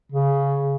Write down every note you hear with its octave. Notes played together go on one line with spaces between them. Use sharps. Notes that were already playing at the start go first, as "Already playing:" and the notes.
C#3